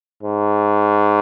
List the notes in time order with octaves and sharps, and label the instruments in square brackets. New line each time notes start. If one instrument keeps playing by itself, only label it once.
[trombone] G#2